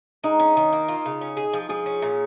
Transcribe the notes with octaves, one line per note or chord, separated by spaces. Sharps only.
G#3 D#4
C#4
D#3
A#3
F4
C#3
C#4
G#4
F3
F3 G#4
C#4
A#2